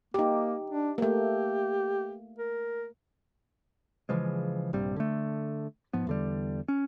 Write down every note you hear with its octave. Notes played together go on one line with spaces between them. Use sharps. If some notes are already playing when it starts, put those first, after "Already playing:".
A#3 D#4 G4
D4
A3 A#3 G4
A#4
C#3 E3 F3 G#3
A#1 G2 C3 G3
D3 A3
G#2 F3 B3
E2 D3 G3
C#4